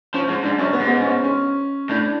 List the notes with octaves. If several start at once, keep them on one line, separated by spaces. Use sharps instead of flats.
F3 C#4
G#2
G#2 D4
F#2 C#4
B3
G#2
B3
C#4
C#4
A2 D4